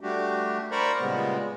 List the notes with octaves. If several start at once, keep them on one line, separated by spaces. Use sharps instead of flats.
G3 A3 D4 F#4 G4
A#4 C5 D5 A#5 B5 C#6
A#2 C#3 G3 G#3 B3